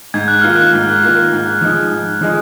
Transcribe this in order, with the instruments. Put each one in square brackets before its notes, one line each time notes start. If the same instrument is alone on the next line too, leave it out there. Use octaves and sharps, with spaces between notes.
[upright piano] G#2 [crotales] G#6
[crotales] F#6
[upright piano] D#3 A#3 F4 [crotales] F6
[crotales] F#6
[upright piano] G#2
D#3 A#3 F4
G#2
F3 G#3 D#4
G#2
F3 G#3 D#4